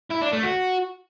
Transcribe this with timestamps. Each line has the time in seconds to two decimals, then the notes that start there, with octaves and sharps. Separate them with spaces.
0.11 E4
0.22 D4
0.33 A3
0.44 F#4